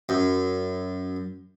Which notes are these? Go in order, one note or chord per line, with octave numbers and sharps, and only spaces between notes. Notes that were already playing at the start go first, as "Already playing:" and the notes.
F#2